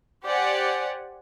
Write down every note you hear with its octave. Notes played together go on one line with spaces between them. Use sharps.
G4 C5 D5 F#5 G#5